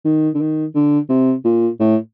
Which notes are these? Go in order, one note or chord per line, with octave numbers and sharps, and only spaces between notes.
D#3
D3
D#3
D3
C3
A#2
A2